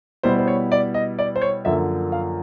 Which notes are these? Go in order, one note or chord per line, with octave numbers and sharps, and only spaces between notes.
B2 G3 B3 E4 C5
C5
C#5
D5
D#5
D5
C5
C#5
F#2 D3 F3 A#3 E5
F5